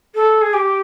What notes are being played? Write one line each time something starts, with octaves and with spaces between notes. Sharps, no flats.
A4
G#4
G4